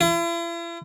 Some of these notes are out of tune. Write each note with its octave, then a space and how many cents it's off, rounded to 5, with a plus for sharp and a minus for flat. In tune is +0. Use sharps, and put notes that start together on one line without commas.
E4 +45